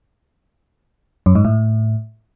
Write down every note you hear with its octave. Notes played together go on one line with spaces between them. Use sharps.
F#2
G#2
A2